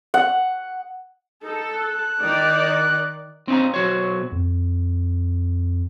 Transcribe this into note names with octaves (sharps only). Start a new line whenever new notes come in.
F#5
D#4 A4
F#6
D#3 D#4 D5
C4 C#4 D#4 F5 A#5
B1 F#4 C5 C#5
F2